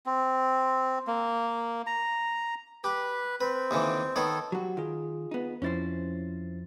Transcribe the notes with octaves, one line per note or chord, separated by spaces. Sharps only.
C4
A#3
A#5
G4 B4
C4 B4
D#2 D3 E3
D#3 B3 A4 C#5
F#3 F#4 G4
D#3 F4 G#4
B3 D#4
F2 F3 C#4 E4 C5 A6